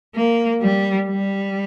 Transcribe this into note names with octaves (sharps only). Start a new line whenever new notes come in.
A#3
G3
G3